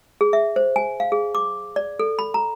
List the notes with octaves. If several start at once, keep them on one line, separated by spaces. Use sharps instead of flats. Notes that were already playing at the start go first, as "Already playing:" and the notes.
G#4
E5
C5
G#5
F5
G#4
D6
D5
A4
B5
A#5